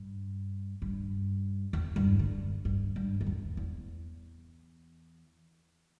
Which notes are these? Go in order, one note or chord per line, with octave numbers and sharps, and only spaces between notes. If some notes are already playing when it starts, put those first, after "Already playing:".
Already playing: G2
G2
E2
G2
D3
G2
G2
G2
E2
E2